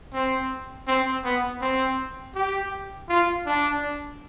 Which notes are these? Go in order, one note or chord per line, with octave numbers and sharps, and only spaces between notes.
C4
C4
B3
C4
G4
F4
D4